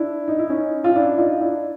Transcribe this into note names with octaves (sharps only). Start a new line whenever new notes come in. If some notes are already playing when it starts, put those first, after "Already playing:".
Already playing: D4 E4
D#4
E4
C#4 D#4
F4
D4 E4
D#4 F4
D4 E4